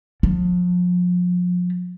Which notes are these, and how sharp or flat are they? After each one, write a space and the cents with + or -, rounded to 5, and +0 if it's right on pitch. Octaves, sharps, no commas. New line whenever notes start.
F3 +35